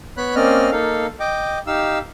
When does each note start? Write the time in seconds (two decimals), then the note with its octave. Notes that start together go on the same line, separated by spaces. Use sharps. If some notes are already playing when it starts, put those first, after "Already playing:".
0.17 B3 C#5 B5 F#6
0.35 A#3 C4 C#4 D5 D#5 F6
0.72 A#3 D#4 A4 F5
1.20 D#5 G5 D6
1.67 D#4 G4 F5 E6